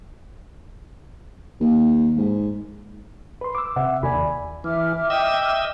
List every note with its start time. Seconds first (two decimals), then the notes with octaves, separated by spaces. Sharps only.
1.61 D#2
2.17 G#2
3.41 B4 C6
3.55 D6 E6
3.76 C3 E5 F#5
4.03 D#2 D5 G#5 B5
4.64 E3 E5 D6 F6
5.10 D#5 G5 E6